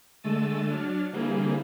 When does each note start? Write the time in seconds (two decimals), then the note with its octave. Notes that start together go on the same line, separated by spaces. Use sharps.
0.23 D3 G#3 A3 E6 A6 D#7
0.70 F#3 D4 F6 A6
1.12 D3 E3 G3 A#3 C4 G#4